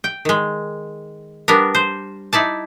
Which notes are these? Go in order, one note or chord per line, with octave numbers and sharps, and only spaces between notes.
G5
D#3 G#3
G3 B3 D4 A#4
C5
D#4 E4 D5 A5